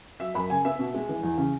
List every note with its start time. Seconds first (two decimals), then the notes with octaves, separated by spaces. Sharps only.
0.20 F#3 E5
0.34 F#2 B5
0.50 C#3 G#5
0.65 B3 E5
0.79 B2
0.94 G#3
1.09 E3
1.23 E2
1.38 C#3